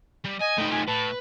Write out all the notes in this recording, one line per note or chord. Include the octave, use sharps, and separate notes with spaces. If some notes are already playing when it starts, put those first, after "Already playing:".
G3
D#5 G#5
A3 D#4 B4 G5
F4 G4 G#5
A2 B4 A5